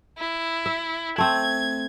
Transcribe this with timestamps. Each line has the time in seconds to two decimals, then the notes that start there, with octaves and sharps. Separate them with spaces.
0.18 E4
0.66 E5
1.18 A3 C4 G#6